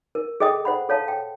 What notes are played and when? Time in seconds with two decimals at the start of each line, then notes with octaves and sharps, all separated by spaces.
0.15 A#4
0.40 G#4 A4 D#5 G5 D#6
0.65 C5 F#5 B5
0.89 A4 C#5 F5 A5
1.08 G5